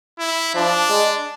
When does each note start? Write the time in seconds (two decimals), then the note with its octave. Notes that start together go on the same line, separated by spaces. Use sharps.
0.19 E4
0.55 F3 D4
0.90 G#3